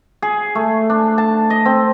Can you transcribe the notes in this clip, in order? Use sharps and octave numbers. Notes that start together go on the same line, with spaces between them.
G#4
A3
D4
A5
D#5
C4